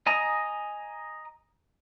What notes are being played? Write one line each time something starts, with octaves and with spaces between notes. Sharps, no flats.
D#5 G#5 A#5 D#6